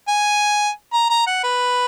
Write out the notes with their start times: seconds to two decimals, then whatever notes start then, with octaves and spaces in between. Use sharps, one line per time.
0.08 G#5
0.93 A#5
1.10 A#5
1.27 F#5
1.44 B4